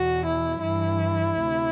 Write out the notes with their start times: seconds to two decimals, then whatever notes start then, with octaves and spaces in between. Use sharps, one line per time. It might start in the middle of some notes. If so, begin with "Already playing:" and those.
Already playing: E2 B2 F#4
0.25 E4
0.63 G2 E3 E4
1.38 D2 C3